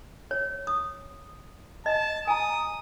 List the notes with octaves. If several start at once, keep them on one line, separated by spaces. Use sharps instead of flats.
C#5
D#6
D#5 A5
G#5 A#5 D#6